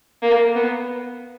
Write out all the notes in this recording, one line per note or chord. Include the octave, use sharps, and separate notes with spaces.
A#3
B3